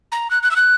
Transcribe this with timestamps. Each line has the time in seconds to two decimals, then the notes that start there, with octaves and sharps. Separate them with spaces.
0.12 A#5
0.31 F#6
0.43 F#6
0.51 E6
0.56 F#6